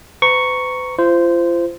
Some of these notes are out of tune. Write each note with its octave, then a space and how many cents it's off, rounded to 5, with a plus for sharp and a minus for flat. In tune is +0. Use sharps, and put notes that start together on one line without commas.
B4 +45 A#5 +0 C#6 +0
F4 -35 C5 -15